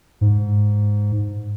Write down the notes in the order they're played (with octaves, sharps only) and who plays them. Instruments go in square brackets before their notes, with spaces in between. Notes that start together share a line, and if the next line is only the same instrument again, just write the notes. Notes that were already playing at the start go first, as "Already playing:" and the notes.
[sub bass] G#2